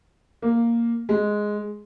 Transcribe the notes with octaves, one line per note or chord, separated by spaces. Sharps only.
A#3
G#3